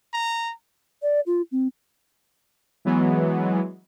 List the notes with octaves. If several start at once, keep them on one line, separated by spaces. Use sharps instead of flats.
A#5
D5
F4
C4
E3 F#3 G#3 B3